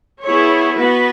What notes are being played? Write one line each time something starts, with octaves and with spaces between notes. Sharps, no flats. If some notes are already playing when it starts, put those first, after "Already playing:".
B3 E4 G#4 C#5
B3 F#4 B4